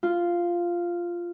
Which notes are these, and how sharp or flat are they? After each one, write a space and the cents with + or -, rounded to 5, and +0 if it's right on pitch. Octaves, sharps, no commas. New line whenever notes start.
F4 -5